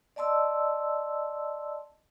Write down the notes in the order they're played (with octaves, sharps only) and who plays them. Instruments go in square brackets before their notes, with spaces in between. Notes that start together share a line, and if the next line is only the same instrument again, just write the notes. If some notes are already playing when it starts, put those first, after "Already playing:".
[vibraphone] D5 D#5 A5 C6 E6